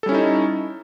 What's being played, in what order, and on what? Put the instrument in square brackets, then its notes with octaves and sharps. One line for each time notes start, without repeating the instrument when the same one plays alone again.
[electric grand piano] A4
G3
C#4
E4
D#4